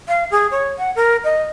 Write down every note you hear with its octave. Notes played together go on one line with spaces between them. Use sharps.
F5
G#4
C#5
F#5
A#4
D#5